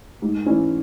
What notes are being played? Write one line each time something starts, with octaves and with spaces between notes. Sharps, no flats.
G#2
E3 C#4 E4